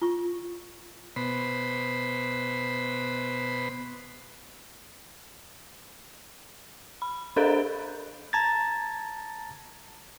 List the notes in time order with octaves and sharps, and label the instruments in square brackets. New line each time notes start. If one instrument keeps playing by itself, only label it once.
[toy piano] F4 C#6
[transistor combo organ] B2 C5 B5
[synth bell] B5
D4 A4 A#4 C5 F5 A#5
[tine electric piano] A5 A#5 G#6 A6